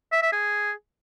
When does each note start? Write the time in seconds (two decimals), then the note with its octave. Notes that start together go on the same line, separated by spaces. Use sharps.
0.12 E5
0.22 E5
0.32 G#4